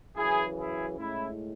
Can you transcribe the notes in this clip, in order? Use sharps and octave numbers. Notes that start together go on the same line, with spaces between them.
F#2 C#3 E3 E4 G#4
E4 G#4
A2 G#3 C#4 E4